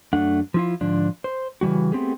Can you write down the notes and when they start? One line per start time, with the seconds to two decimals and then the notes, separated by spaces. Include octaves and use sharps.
0.13 F#2 A3 D4 F#5
0.54 F3 E4 F4
0.81 G#2 D3 F3 D4
1.24 C5
1.61 C#3 E3 G3 F#4
1.92 A3 B3 C4 G4 G#4